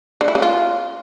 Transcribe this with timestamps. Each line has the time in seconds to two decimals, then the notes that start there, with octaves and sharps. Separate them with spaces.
0.21 D3
0.28 E4
0.35 C#3
0.42 F4